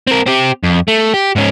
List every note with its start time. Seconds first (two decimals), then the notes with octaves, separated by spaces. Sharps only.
0.07 C4 A#4
0.26 C4 G4
0.63 F2
0.88 A3
1.14 G4
1.36 G#2 C#4